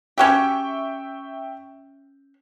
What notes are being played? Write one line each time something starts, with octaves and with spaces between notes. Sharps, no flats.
C#4 F#4 G4 E5 G5 C#6